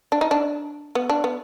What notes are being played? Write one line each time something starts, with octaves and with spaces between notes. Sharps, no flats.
D4
D#4
D4
B3
D4
B3